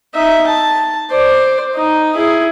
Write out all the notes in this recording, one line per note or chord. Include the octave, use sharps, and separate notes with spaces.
D#4 E5
A5
C5 D5
D#4
E4 G#4